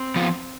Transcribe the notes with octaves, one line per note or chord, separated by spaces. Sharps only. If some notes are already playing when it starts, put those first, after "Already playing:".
Already playing: C4
F3 B3 F4